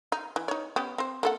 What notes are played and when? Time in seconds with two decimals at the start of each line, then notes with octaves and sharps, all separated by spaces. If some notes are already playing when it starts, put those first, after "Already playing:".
0.12 D#4
0.36 E3
0.48 D#4 C#5
0.76 B3 C#4 G4
0.98 C4 C5
1.23 A#3 A4 F#5